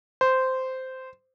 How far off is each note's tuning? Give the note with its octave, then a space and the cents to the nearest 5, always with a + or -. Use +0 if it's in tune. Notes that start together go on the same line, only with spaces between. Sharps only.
C5 -10